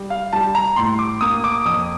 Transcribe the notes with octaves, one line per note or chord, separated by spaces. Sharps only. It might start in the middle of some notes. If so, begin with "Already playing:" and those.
Already playing: G3
F5
G3 A5
A#5
A2 C6
D6
A#3 D#6
D6
F2 D#6